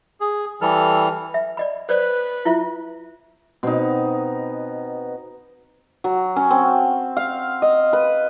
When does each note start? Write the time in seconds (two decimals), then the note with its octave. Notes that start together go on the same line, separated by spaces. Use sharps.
0.21 G#4
0.61 E3 G3 A4 F6
1.34 E5
1.57 D5 D#5 B5
1.89 B4 C5 D5
2.45 E4 F4 E5
3.63 B2 C4 D#4
6.04 F#3
6.36 C#4
6.51 C4
7.17 F5
7.62 D#5
7.93 B4